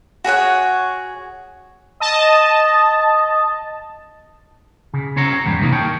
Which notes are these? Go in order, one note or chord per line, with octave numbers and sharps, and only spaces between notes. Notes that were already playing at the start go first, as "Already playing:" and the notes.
F#4 G#4 C#5 F#5
D#5 A5
C#3
C#4 C5 C#5 A#5
E2 G#2 B2 G3
C3 D#3 A#3 D4 D#4
A#4 C#5 G5 A5